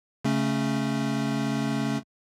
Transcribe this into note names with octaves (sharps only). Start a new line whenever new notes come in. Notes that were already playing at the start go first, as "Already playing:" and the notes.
C#3 A3 C#4